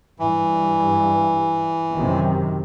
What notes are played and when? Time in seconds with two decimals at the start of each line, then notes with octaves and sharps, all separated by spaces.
0.20 G2 E3
1.95 F#2 C3 D#3